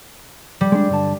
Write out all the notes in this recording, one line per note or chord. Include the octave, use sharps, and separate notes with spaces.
G3
G#3 D4
G2 D3 A5